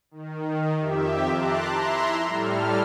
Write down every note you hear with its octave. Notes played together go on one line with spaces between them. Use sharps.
D#3
F2 G4 E5
A5 A#5 C6 D6 F#6
E4 E5 A#5 C6
A2 G3 A4 F6